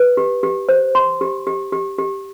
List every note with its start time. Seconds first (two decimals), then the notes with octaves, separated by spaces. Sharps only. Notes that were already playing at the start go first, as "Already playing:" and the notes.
Already playing: B4
0.17 G4
0.43 G4
0.69 C5
0.95 C6
1.21 G4
1.47 G4
1.72 G4
1.98 G4